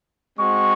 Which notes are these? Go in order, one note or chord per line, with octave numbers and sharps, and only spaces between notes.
G#3 C4 F#4 C#6